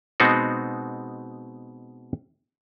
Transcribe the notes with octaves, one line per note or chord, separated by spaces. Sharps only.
B2 G#3 B3 C4 D#4 F#4